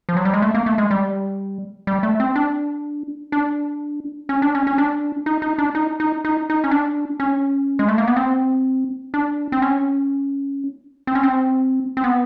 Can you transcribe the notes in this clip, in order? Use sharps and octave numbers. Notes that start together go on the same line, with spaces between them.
F3
F#3
G3
G#3
A3
A#3
A3
G#3
G3
G3
A3
C4
D4
D4
C#4
D4
C#4
C#4
D4
D#4
D#4
D4
D#4
D#4
D#4
D#4
C#4
D4
C#4
G#3
A3
A#3
B3
C4
D4
C4
C#4
C4
C#4
C4
C4
B3